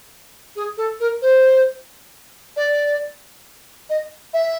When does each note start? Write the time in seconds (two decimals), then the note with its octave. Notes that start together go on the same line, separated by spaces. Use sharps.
0.56 G#4
0.77 A4
1.00 A#4
1.21 C5
2.56 D5
3.89 D#5
4.33 E5